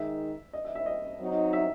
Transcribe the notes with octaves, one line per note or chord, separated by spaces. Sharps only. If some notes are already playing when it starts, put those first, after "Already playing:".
Already playing: D#3 G#3 D#4 E5
D#5
E5
E5
D#5
F#3 C4 D#4
E5